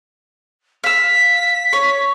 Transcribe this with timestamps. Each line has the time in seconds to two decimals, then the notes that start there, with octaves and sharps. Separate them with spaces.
0.84 F5 E6 B6
1.73 C#5